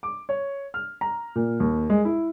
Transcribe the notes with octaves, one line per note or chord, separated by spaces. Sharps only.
D6
C#5
F6
A#5
A#2
D#2
G#3
E4